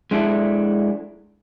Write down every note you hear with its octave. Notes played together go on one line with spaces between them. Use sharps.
G#3 D4 E4 A4